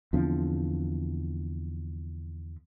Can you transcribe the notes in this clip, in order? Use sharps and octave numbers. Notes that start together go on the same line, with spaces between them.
E2 D3 F3 C4